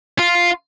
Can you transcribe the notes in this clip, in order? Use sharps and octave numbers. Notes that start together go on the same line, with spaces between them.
F4